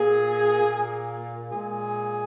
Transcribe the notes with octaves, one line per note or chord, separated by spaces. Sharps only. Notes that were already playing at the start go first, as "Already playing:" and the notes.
Already playing: A#2 A#3 G#4
A#2 A#3
A#2 G#3 G#4